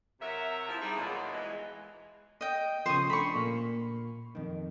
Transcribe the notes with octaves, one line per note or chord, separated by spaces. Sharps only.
C3 F#3 A#4 E5
F3 E4
G3 D#4 E4 G#4
D#2 B2 F#3 G#3 F4 D5
E3 G#3
D#5 G5
C#3 F3 C5 C#6 D#6
A3 D4 B5 C#6
A#2 A#3
F2 D#3